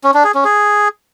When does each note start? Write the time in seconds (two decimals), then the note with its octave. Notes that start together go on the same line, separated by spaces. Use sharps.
0.04 C#4
0.14 D4
0.24 G#4
0.34 C#4
0.45 G#4